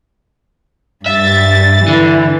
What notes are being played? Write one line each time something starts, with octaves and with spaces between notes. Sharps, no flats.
G2 E5 A6
D3 E3